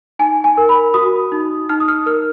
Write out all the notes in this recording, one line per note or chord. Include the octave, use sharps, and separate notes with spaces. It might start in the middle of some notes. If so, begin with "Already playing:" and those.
D#4 G#5
G#5
A#4
B5
F#4 D#6
D#4
D#4 F6
D#6
F6
A#4 F6